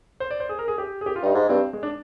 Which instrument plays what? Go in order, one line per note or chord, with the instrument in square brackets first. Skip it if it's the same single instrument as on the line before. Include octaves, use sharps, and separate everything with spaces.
[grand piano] C5
D5
C5
G#4
A#4
G#4
G4
G#4
G4
F4
[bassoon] G2 [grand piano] D#4
[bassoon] G#2
[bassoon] G2 [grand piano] C4
[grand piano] G#3
D4